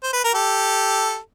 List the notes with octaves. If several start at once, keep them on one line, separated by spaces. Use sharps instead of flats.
C5
B4
A#4
G4 A4